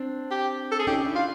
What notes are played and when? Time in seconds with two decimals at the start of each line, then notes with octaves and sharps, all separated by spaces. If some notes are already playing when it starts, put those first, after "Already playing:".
Already playing: C4 D4
0.31 G4
0.71 A4
0.79 G#4
0.87 C#4 D#4 G4
1.05 D4 E4
1.15 F4